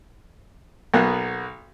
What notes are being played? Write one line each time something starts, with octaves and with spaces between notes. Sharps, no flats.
B1 A#3 B3 F#4 F#6